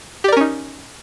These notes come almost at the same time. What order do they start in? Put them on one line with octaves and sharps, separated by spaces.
G4 D5 A#4 C#4 D#4